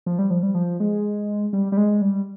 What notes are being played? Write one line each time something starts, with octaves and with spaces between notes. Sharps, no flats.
F3
G3
F3
G3
F3
G#3
G3
G3
G#3
G3